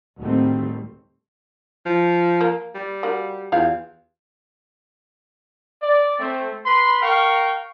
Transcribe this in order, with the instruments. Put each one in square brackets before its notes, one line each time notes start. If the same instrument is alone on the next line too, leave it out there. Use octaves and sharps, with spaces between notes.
[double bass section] D2 A2 D#3 G3 A3 C4
[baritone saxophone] F3
[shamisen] A#3
[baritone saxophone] G3
[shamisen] A#3 F#4 G#4
[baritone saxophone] E2 [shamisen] F4 G4 F5
[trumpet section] D5
A3 C4
B4 B5 C6
A#4 F5 G5 C#6